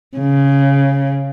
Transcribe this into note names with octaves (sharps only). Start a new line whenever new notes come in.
C#3